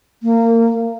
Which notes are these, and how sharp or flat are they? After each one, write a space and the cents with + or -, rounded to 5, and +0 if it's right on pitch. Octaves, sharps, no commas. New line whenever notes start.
A#3 -25